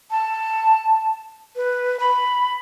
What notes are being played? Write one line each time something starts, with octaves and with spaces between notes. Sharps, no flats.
A5
B4
B5